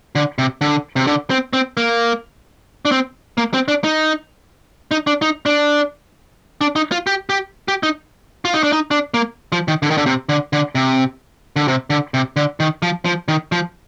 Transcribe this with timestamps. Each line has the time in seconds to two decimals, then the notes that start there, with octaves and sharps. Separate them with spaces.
0.15 D3
0.38 C3
0.61 D3
0.96 C3
1.07 D3
1.30 C4
1.53 C4
1.77 A#3
2.85 D4
2.92 C4
3.38 A#3
3.54 C4
3.68 D4
3.84 D#4
4.91 D#4
5.07 D4
5.22 D#4
5.46 D4
6.61 D4
6.76 D#4
6.92 F4
7.07 G4
7.30 G4
7.68 G4
7.83 D#4
8.45 F4
8.54 D#4
8.63 D4
8.73 D#4
8.91 D4
9.14 A#3
9.52 F3
9.68 D#3
9.82 D3
9.90 D#3
9.97 D3
10.06 C3
10.29 D3
10.53 D3
10.75 C3
11.56 D3
11.68 C3
11.90 D3
12.14 C3
12.36 D3
12.60 D#3
12.82 F3
13.05 F3
13.28 D#3
13.52 F3